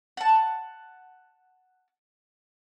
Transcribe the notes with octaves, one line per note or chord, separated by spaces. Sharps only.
F#5 A5